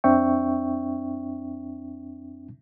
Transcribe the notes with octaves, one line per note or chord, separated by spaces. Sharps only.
F2 C4 D4 E5 G5 C#6